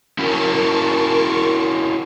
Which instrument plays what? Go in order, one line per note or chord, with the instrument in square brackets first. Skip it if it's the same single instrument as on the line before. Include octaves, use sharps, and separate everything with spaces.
[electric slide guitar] C#4 E4 F#4 [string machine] A#4 A5 C#6